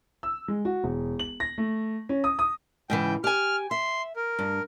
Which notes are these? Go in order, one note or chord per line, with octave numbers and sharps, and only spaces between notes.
E6
G#3
F#4
E1
F#7
A#6
A3
C#4
D#6
D#6
G#2 C#3 E3 G5
G4 G#5 F6
E5 C6
A#4
G2